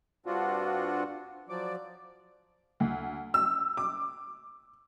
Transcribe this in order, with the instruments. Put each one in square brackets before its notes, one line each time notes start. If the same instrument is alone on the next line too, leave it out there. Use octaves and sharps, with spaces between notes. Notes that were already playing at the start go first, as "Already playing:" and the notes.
[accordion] G2 C4 D4 F4 F#4
F3 F#3 D5
[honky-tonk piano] D2
E6
D6